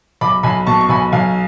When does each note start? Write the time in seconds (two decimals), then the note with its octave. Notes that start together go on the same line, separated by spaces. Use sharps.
0.21 B1 B5 D6
0.43 B1 G#5 B5
0.67 B2 A5 C#6
0.81 C#6
0.89 B1 G#5 B5
1.12 B1 F5 G#5